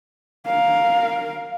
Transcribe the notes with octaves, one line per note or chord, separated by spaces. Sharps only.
A#4 F5